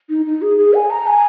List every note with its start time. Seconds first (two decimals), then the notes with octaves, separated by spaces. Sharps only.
0.09 D#4
0.25 D#4
0.42 G#4
0.58 G#4
0.74 G#5
0.90 A#5
1.07 G#5